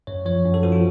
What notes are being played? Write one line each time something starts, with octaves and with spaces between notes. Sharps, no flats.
F#2 C#5
F3 C#5
F#2
A4
F3 F#4
F4